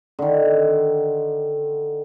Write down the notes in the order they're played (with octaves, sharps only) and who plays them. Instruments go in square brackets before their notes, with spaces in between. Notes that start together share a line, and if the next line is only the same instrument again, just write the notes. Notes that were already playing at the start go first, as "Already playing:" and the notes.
[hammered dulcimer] D3 D#3